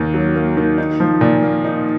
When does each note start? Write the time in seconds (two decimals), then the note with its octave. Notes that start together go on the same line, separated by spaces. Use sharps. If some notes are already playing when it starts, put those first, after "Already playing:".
Already playing: D#2 D#3 A#3
0.14 F#3
0.36 A#3
0.57 D#3
0.78 D#4
1.00 F3
1.21 A#2
1.43 A#3
1.64 D#4